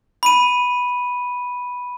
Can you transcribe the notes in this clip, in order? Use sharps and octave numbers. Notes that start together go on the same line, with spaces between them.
B5 D#7